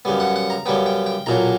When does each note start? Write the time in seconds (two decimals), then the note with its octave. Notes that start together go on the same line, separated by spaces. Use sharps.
0.05 F#2 C#3 G3 B3
0.20 F#5
0.36 F#5
0.50 A#5
0.66 F#2 C#3 G3 B3 G5
0.86 G5
1.06 G5
1.26 B1 A#2 F#3 A#5